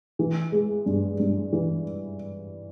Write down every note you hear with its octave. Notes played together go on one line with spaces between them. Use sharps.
E3
G#3
G2
G2
E3